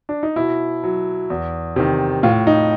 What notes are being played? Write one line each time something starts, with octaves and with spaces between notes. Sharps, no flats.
D4
D#4
B2 E4
F#3
E2
C3 D#3
A2 F4
D#4